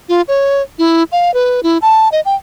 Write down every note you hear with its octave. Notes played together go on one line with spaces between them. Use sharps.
F4
C#5
E4
F5
B4
E4
A5
D#5
G5